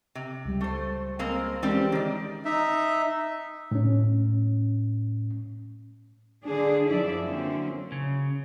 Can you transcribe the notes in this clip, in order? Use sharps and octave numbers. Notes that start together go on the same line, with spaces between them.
C3
C#2 G3
A3 C5
G#3 A#3 C4
E3 G3 G#3 C4 C#4 G4
D#3 D5
D#4 E5
A2 C#4
D3 D4 G#4
F#2 F3 E4 D5 E5
D3 F#3 A#3 C4 C#4
C#3